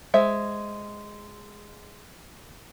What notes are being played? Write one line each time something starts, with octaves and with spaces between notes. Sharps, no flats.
G#3 C5 E5